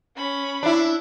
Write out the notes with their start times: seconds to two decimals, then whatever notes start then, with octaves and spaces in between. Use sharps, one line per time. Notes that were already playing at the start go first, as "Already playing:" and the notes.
0.17 C#4 B5
0.63 D4 E4